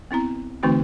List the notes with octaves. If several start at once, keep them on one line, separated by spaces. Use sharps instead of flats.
B3 C4 E4 A#5
D3 E3 A3 C4 D#4 F#4